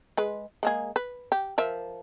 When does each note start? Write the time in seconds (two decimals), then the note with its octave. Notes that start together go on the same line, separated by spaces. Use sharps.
0.17 G#3 B4
0.63 G#3 A#3 G#4
0.96 B4
1.32 G4
1.58 F3 A#4 E5